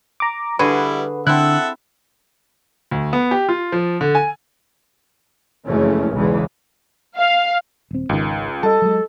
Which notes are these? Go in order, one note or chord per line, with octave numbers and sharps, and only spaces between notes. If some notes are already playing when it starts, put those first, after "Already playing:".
A#5 D6
D3 G3 E4 F#4 G#4 B4
D3 C4 E4 A4 E5 F#5 F#6
D2
B3
G4
F4
F3
D3
G#5
F#1 F2 E3 G#3 A3 C#4
B1 E2 C#3 E3 G#3
F5
D#1 C4
G#1 C#2 G#2 D#3
G3 A4 D#5 A5
F#3 G#3